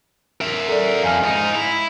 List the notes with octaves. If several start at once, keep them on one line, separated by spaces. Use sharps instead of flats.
A#4 E5
A4 D5
F2 F5 G#5 F6
G#2 D#4
E4